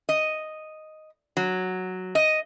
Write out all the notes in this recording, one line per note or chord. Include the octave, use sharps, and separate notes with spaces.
D#5
F#3
D#5